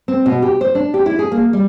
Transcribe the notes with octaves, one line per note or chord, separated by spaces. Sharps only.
C4
B2
G4
C5
D4
G4
E4
G#4
A#3
G3